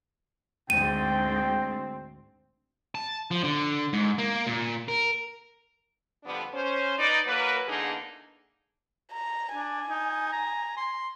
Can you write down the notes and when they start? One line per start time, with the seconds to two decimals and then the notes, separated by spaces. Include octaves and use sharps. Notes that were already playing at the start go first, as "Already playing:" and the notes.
0.70 D2 G#2 C4 G5 D#7
2.95 A5
3.31 F3
3.44 D3
3.93 G#2
4.18 A#3
4.47 A#2
4.88 A#4
6.24 F2 D3 G3 B3 D4
6.53 C#4 C5
6.98 D#4 B4 D5
7.26 F#3 A#3 A#4 B4
7.67 E2 D3 A#3 D4 D#4 G#4
9.13 A#5
9.55 D4 G#5
9.89 D#4
10.32 A#5
10.77 C6